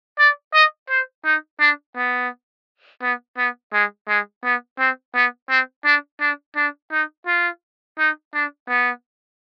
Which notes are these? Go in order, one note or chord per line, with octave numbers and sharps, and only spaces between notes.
D5
D#5
C5
D#4
D4
B3
B3
B3
G#3
G#3
B3
C4
B3
C4
D4
D4
D4
D#4
F4
D#4
D4
B3